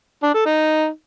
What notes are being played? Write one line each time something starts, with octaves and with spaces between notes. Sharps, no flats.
D4
A4
D#4